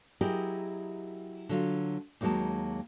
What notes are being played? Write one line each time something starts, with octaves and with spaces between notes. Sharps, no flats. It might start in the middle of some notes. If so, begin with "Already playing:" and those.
F#3 E4 G4 G#4 A#4 D#5
D3 F#3 F4
D#2 D3 F#3 G#3 A#3 A5